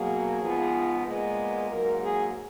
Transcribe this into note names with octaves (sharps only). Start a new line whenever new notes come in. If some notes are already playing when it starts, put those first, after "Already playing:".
Already playing: B2 F#3 A#3 G#4
G#2 F3 B3
A#2 G#3 B3
G#2 F#3 A#3 A#4
G#4